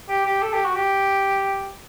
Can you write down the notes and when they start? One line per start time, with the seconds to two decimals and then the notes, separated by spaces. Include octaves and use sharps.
0.08 G4
0.25 G4
0.42 A4
0.53 G4
0.64 F#4
0.76 G4